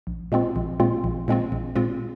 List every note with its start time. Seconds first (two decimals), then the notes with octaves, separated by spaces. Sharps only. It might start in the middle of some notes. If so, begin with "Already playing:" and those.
0.07 A#1
0.32 A#2 G#3 C4 F4
0.56 A#1
0.80 A#2 G#3 C4 F4
1.04 A#1
1.28 A#2 G#3 C4 F4
1.52 A#1
1.76 A#2 G#3 C4 F4